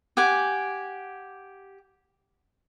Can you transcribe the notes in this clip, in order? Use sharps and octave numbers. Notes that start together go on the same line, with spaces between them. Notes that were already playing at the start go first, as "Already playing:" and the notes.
G4 F#5 G#5 D6